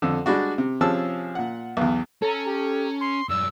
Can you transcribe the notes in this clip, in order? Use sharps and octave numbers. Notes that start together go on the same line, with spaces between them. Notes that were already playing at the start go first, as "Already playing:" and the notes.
F2 D3
G3 G#3 D4 F#4
C3
C3 F3 C#4 G#4 A5 E6
A#2 F#5
B1 E2
C#4 A4 A#5
G4
C6
F#2 D4 E6